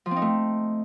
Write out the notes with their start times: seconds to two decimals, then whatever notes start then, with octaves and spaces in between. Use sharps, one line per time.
0.06 F3
0.11 C4
0.16 D#4
0.22 A3